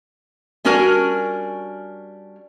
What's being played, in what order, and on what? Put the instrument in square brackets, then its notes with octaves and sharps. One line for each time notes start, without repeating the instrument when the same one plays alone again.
[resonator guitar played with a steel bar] G3 C#4 D4 F#4 A#4 G#5